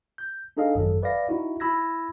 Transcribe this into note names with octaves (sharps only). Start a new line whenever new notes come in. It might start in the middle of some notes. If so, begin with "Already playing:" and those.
G6
D4 D#4 G#4 A4 D#5 F5
G#1 F#2 F#3 A4
B4 D5 E5 F5 A#6
D#4 E4 F#4
E4 B5 E6 G#6 A#6